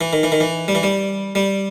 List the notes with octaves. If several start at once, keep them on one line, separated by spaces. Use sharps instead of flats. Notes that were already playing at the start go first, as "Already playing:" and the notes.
E3
D#3
E3
D#3
E3
G3
E3
G3
G3